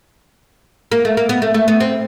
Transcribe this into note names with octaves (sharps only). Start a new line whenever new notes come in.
A#3
A3
A#3
B3
A3
A3
B3
C4